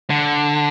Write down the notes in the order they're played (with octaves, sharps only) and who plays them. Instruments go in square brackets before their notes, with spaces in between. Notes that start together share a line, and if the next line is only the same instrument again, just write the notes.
[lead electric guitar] D3